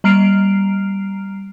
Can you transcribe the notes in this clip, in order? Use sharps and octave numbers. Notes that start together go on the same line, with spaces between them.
G3 A#5 F6 C7 D7 F7